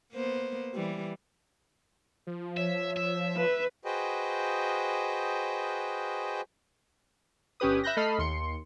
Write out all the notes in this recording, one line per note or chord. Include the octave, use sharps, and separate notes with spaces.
A#3 B3 C5
E3 G3
F3
C#5 E5
E5
B4
F#4 G#4 B4 C5 D#5 G5
G1 C#4 G4 B4 D#6
E5 B5 F#6 G6 A#6
A3 A4 D#5 B5 F6 C7
D#2 C6 C#7